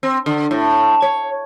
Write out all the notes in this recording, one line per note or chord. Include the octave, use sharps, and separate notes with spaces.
C4
D3
A2
C#5